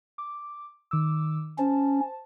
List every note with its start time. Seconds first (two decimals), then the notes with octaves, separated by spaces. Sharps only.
0.18 D6
0.91 D#3 D6 E6
1.59 C#4 C5 A5